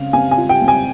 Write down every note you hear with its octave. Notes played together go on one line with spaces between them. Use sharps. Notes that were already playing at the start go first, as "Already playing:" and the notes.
Already playing: C#3 C4 F5
C4 G#5
G#5
F4
G5
C4
G#5